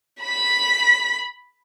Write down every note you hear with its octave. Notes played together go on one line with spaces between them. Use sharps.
B5 B6